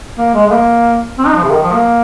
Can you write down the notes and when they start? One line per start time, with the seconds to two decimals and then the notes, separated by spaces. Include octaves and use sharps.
0.18 A#3
0.34 G#3
0.47 G#3
0.52 A#3
1.18 C4
1.27 D#4
1.35 F3
1.44 C3
1.51 D#3
1.63 F3
1.74 A#3